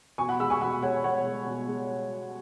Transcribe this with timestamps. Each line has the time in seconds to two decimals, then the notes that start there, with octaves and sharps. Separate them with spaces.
0.18 B2 G#5 C#6
0.29 F#5 B5
0.40 G#3 B5 E6
0.50 G#5 C#6
0.61 B2 F#5 B5
0.82 G#3 C#5 F#5
1.04 B2 C#5 F#5
1.25 G#3
1.46 B2
1.68 G#3